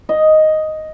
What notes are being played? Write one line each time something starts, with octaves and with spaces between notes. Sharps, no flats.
D#5